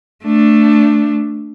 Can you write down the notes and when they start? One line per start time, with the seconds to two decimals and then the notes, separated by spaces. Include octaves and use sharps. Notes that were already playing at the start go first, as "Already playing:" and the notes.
0.24 A3 D4